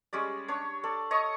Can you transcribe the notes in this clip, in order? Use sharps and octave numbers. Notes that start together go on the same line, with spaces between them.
G3 G#3 C#4 D5
D4 C#5
A4 D5
C#5 D#5 C#6 D#6